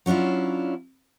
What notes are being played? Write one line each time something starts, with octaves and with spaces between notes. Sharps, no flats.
F#3 C#4 D4 E4 F4